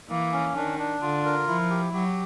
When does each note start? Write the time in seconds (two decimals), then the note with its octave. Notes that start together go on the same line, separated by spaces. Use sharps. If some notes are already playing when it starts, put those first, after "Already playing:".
0.10 E3 A#3
0.32 C#4
0.56 D#3 D4
0.79 D4
1.01 D3 F4
1.25 A#4
1.48 F3 E4
1.70 G4
1.93 F#3 G4